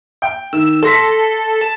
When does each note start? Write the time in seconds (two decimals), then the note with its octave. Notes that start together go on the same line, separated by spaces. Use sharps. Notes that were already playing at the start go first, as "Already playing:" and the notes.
0.22 G5
0.53 D#3 E6
0.83 A4 C6 A#6 B6
1.61 A5